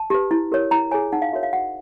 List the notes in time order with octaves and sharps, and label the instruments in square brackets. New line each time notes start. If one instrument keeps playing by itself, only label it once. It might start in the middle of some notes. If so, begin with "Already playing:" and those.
Already playing: [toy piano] A5
G4 B4
E4
G4 A#4 C#5
E4 A#5
G#4 C#5 G#5
D#4 F#5
F5
F#4 A#4 C#5 E5
F5
F#4 F#5